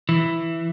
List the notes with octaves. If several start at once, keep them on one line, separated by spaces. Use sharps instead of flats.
E3